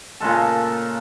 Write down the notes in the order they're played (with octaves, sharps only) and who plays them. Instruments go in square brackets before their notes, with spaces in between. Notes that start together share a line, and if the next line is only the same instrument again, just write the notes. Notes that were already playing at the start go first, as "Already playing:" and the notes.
[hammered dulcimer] A#2 C#3 G#3 A4